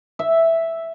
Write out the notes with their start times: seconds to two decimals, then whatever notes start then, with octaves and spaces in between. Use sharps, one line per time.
0.19 E5